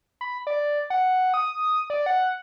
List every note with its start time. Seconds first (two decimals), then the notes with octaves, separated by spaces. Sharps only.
0.21 B5
0.47 D5
0.90 F#5
1.34 D#6
1.90 D5
2.06 F#5